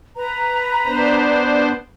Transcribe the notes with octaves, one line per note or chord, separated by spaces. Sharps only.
B4 A#5
B3 D4 C5